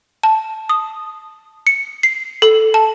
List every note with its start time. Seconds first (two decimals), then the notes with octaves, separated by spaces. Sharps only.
0.23 A5
0.69 D#6
1.67 C#7
2.03 C7
2.42 A4
2.74 A5